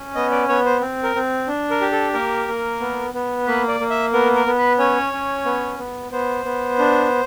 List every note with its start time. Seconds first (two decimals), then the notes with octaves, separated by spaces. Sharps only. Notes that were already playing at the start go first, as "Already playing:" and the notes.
Already playing: C#4
0.15 B3 D#5
0.32 D5
0.49 B3 C#5
0.66 C5
0.81 C4
1.03 A#4
1.15 C4
1.47 D4
1.71 A#4
1.81 G4
1.92 A4
2.14 A#3 A#4
2.48 A#3
2.80 B3
3.14 B3
3.47 A#3 B4
3.68 D5
3.80 A#3
3.90 E5
4.13 B3 A#4
4.35 A#4
4.46 B3
4.57 B4
4.79 C#4 C#5
5.13 C#4
5.45 B3
5.78 B3
6.11 B3 C5
6.45 B3
6.79 D4